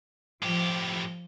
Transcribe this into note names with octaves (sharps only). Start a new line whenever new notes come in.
A2 F3 G4